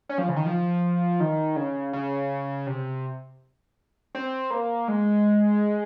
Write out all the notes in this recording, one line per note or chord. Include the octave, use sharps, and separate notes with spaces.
C#4
F3
C#3
D#3
F3
D#3
C#3
C#3
C3
C4
A#3
G#3